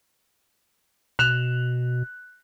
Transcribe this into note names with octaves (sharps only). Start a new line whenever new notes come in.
B2 F#6 E7 F7